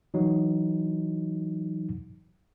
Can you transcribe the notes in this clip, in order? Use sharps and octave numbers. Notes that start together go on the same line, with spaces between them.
E3 F#3 D#4